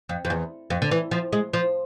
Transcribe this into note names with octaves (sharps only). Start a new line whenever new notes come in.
F2
F2
E2
F2
D3
E3
F3
G#3
F3